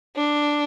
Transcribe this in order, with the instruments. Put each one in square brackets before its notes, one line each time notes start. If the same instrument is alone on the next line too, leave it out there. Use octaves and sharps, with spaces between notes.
[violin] D4